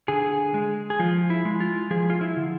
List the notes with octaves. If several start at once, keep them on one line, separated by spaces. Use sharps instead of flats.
D3 G#4
G#3
G#4
F3 F4
E4
G#3
F4
F3 G#4
F4
E4
D3